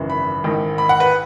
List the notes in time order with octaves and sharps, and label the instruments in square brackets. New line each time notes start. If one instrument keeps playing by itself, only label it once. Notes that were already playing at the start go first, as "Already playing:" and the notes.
Already playing: [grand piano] G#1 F#2 C#3 E3
B5
A1 G#2 D#3
B5
F#5
B4